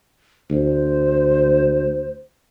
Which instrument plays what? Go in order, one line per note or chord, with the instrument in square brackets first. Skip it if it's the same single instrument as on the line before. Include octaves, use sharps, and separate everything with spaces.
[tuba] D2 [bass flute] C5